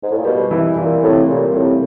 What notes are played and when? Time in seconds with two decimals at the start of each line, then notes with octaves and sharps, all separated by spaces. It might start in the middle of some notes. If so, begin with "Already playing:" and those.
0.02 G#2
0.10 A2
0.18 A#2
0.25 B2 G3
0.51 E3
0.77 A#2 E3
1.02 A2 C3
1.28 A#2 G3
1.54 A2 C3